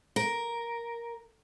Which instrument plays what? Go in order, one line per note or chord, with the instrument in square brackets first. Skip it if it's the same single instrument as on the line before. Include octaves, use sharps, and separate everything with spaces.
[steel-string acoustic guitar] A#4